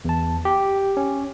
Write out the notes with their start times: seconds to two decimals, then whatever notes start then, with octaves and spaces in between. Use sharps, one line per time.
0.05 E2 A5
0.45 G4
0.97 C#4